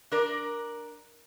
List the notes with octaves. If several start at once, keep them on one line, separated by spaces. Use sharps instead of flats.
D4 A#4 D5